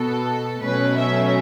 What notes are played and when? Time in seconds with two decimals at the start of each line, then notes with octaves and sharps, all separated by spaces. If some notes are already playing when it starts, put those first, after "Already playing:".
Already playing: B2 B3 A4
0.62 B2 F#3 A3 C#4 B4
0.96 E5